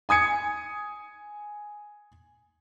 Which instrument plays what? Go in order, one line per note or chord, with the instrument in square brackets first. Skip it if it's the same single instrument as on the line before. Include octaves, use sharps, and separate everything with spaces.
[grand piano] G#5 D#6 G#6 C#7